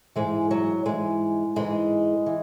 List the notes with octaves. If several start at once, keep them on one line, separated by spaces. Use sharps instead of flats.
G#2 E3 G#3
F#3
G#2 E3 G#3
G#2 E3 G#3
E3